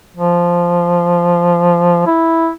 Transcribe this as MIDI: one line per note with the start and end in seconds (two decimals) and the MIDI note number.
0.17 2.05 53
2.07 2.50 64